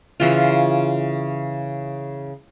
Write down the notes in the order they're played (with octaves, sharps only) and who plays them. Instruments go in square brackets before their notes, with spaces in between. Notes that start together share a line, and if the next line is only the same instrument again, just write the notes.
[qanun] C#3 E3 F4